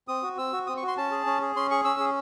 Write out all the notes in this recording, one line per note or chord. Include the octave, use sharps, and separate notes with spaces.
C4 D#6
F#4
C4 E6
F#4
C4 D#6
C#6
F#4
C6
C#4 A5
G#4
C#4
G#4
C#4 C6
G#4 C#6
C#4 E6
G#4